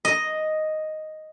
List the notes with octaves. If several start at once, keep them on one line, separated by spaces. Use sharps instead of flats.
D#5